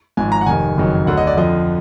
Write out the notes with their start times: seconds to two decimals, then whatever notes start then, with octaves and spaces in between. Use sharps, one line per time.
0.17 G#1 G#2 F3 G#5
0.32 A#5
0.41 F#5
0.46 F1 F2 D#3 G#5
0.77 F#1 F2 D#3 F#3
1.07 D2 D3 F#3 F#5
1.17 D#5
1.27 D5
1.37 F2 D3 F3 D#5